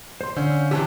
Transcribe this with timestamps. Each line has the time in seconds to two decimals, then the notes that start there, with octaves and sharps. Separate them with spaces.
0.21 C5 C6
0.36 D3 C#4 F5 E6 G6
0.71 C3 E3 G4 A5 C#6